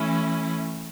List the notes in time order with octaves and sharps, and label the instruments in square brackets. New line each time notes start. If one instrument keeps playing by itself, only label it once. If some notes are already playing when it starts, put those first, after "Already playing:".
Already playing: [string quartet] E3 A3 C#4 E4